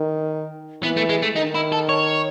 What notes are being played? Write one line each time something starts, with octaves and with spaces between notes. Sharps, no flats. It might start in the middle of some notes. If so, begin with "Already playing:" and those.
Already playing: D#3
E3 B3
A3
G#3
A3
D#3 D#4
E4
A4
C#5